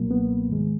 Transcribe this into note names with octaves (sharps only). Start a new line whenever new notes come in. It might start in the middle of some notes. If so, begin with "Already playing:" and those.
Already playing: C#2 B2 F#3 A#3
B3
G#2 D#3 G#3